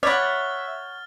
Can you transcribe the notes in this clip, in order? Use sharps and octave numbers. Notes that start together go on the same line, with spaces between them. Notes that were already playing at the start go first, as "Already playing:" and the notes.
C#5 D5 E5 F#5 B5 F6 A6